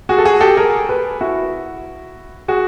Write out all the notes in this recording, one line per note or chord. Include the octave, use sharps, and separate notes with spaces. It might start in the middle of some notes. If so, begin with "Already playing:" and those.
F#4 G#4
A4
F#4 G#4
G4 A4
G#4 A#4
A4 B4
E4 F#4
F#4 G#4